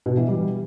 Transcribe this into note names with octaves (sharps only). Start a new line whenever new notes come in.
B2
E3
G3